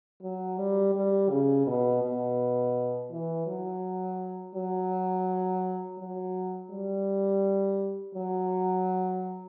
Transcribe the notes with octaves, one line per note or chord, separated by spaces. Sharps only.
F#3
G3
G3
C#3
B2
B2
E3
F#3
F#3
F#3
G3
F#3